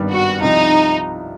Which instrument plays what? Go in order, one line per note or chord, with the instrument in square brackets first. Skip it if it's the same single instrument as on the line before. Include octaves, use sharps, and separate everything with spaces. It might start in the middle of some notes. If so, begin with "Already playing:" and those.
Already playing: [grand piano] G#1 G2 D#3 G3 B3
[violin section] F#4
[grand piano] C2 C3 F3 [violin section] D#4